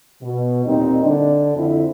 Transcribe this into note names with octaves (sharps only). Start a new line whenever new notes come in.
B2
D#2 A#2 G3 C4 D#4
D3 D4
F2 D3 E4